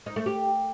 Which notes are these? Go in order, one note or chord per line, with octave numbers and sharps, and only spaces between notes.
D#4
A3
G4